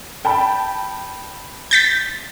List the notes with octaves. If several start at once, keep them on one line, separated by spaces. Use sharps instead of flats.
G5 A5 B5
G6 A6 B6